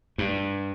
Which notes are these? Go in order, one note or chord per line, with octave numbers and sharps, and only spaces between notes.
G2